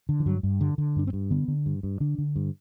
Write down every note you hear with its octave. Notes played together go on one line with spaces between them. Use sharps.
D3
E3
G2 F#3
G2
D3 G3
D3
G2 D4
C4
G2
D3 B3
D3
G2
G2
D3 D4
D3
G2